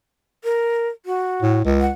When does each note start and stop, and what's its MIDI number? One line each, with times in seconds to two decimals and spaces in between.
0.44 0.88 70
1.06 1.59 66
1.42 1.60 45
1.65 1.89 37
1.81 1.90 78